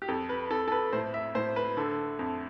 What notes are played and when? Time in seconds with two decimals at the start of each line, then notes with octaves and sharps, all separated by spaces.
0.02 G4
0.08 F2 A4
0.29 B4
0.50 F2 A4
0.68 A4
0.72 B4
0.93 A2 C5
1.14 E5
1.35 A2 C5
1.56 B4
1.77 D3 A4
2.19 F2